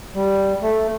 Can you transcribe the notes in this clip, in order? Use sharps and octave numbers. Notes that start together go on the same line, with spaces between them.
G3
A3